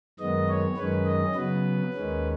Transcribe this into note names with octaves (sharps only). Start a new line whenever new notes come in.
F#2 D#3 G#3 B3 D#5
C#5
F#2 D#3 G#3 C#4 B4
D#5
C#3 F#3 B3 B4
D#2 D#3 G#3 C#4